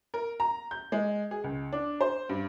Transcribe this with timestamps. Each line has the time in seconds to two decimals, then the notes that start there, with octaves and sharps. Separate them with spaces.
0.14 A#4
0.40 A#5
0.71 G6
0.92 G#3
1.31 G#4
1.44 C#2
1.73 D4
2.01 C5
2.29 G2